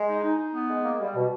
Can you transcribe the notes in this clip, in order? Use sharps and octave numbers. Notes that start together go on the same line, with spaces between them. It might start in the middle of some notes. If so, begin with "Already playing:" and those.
Already playing: G#3
D#4
D#4
D#4
B3
G#3
A#3
G3
B2